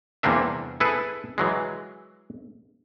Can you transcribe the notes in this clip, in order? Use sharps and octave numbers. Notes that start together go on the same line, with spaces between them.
E2 C3 G3 A#3 D4 E5
E4 G#4 A4 B4
E3 F#3 G#3